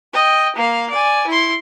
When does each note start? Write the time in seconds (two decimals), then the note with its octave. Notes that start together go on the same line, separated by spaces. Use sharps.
0.13 D#5 G5
0.56 A#3 F5
0.90 D5 G#5
1.27 E4 C6